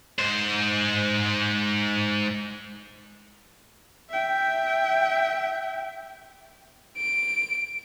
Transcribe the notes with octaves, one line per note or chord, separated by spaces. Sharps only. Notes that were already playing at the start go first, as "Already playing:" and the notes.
G#2 C5
E5 G5
D7